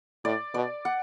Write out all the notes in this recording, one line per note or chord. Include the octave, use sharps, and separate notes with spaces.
A2 D5
B2 D5
F#5